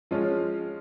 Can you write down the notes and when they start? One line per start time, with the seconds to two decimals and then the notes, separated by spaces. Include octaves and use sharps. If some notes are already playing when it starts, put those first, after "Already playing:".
0.11 F3 G#3 C#4 F4